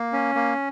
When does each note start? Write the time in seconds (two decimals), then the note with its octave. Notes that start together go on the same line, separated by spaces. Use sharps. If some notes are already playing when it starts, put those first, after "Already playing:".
Already playing: A#3
0.13 C#4
0.35 A#3